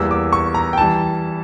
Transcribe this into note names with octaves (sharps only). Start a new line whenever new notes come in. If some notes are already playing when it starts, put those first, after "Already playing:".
Already playing: E2 E3 G3 A#3 E6
D6
C#6
A#5
G5
E3 G3 A5